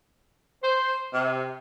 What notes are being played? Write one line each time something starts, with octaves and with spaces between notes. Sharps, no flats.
C5
C3